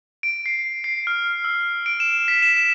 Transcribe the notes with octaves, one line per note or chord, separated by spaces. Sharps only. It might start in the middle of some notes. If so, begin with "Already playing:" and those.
D7
C7
C7
F6
E6
D7
E7
B6
E7
E7